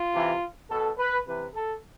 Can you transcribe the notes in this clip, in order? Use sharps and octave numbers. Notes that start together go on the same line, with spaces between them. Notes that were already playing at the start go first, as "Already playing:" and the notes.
Already playing: F4
C3 E3
B2 A4
B4
C3 E3 B4
A4